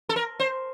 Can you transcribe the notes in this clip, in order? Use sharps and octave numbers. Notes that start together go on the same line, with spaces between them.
A4
A#4
C5